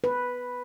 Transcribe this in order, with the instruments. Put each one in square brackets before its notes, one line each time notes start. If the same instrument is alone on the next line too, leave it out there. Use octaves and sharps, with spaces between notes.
[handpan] B4